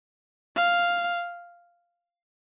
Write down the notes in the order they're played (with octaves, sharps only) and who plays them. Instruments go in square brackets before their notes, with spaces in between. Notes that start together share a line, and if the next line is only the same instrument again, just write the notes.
[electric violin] F5